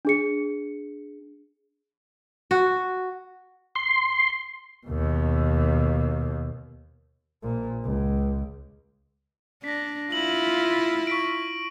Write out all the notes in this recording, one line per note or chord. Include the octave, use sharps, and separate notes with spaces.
D4 G#4 C#7
F#4
C6
D#2 B2
A#1 A#2
C#2
D4 A#6 B6
E4 F4 F#7
C#6 B6 D7